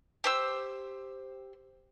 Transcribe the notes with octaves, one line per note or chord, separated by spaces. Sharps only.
G4 C5 E6